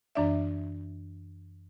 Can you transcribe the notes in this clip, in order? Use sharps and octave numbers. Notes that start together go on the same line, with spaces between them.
F#2 E3 D4 D5 E5